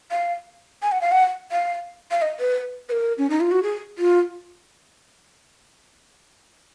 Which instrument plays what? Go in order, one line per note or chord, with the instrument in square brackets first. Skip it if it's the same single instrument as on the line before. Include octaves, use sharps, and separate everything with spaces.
[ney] F5
G#5
F#5
F5
F#5
F5
F5
D#5
B4
B4
A#4
C#4
D#4
F4
F#4
G#4
F4